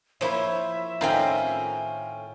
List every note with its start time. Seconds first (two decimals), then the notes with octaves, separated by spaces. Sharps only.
0.21 F3 A#3 E4 C5 C#5 E5
1.01 A2 D#3 C4 C#4 F4 F5 G5 A#5